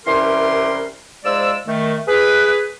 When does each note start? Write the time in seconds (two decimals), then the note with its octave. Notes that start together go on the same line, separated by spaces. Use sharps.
0.06 C2 E3 C#4 G4 A#4 C6
1.24 G#2 F3 G#3 D5 E6
1.67 D#3 A3
2.07 G#4 B4